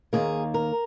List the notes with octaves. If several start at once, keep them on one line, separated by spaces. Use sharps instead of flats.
D#2 D#3 A#3 G#4
A#4